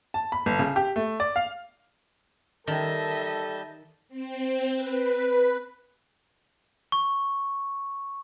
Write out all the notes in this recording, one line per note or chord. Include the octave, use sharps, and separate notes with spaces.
A5
B5
G1
C#3
G4
A3
D5
F5
D#3 G3 A4 D#5 E5 A5 G6
C4
B4
C#6